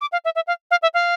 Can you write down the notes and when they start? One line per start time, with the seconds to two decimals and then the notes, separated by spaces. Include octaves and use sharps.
0.01 D6
0.12 F5
0.25 E5
0.35 E5
0.47 F5
0.71 F5
0.82 E5
0.94 F5